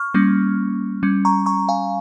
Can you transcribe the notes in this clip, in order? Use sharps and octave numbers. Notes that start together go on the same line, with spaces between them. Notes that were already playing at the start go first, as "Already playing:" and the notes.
Already playing: C#6 F6
G3 A#3 C#4
G3 C#4
A#5 C#6
A#5 C#6
F5 G#5